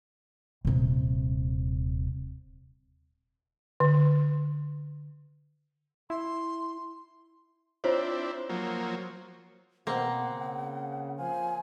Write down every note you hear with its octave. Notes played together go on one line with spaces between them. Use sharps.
D#1 C3
D3
E4 C6
C4 D4 E4 F4 C5 C#5
F3 F#3 A#3
B2 A#3 C4 F#5
C#3
F3 C5 F5 G#5